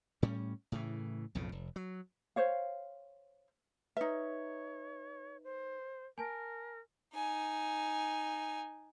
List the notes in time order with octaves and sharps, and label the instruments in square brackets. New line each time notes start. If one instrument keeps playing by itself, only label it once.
[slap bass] A2 G3 C#4
A2 C#3 E3
B1 F2 A2 C#3
F1
F#3
[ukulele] C5 C#5 F5
[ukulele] D#4 E5 [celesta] B4 [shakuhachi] C#5
[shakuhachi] C5
[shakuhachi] A#4 [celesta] G#5 A5
[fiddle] D#4 G#5